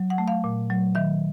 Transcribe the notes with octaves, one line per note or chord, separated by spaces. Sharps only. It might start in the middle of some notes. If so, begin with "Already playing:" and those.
Already playing: F#3
F#5
A3
F5
A#2
F#3
D#3 E5